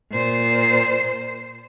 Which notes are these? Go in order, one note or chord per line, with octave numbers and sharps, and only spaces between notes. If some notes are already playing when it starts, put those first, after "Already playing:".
A#2 C5